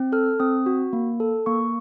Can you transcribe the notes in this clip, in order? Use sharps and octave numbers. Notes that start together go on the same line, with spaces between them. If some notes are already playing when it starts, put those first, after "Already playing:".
Already playing: C4
A4 F6
C4 D#6
F#4
A#3
A4
A#3 C#6